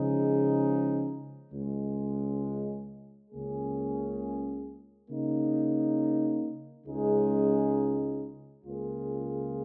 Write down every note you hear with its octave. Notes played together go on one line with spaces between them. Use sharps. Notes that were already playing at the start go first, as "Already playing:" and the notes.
Already playing: C#3 F3 G#3 D#4 G#4
C#2 C#3 G#3
C#2 C#3 A#3 C#4 G#4
C#3 A#3 D#4
C#2 C#3 G#3 D#4 G#4
C#2 C#3 A#3 F4 G#4